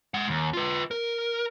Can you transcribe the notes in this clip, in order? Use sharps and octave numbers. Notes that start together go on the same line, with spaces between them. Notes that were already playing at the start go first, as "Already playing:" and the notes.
G#3 F#5
D#2
F4 B4
A#4